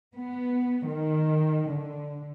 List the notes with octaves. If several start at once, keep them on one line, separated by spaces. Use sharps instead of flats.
B3
D#3
D3